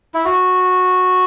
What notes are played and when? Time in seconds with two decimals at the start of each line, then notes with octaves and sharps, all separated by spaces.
0.14 E4
0.25 F#4